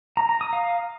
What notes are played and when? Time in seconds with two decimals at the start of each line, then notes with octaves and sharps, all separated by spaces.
0.17 A#5
0.29 A#5
0.41 D#6
0.53 F5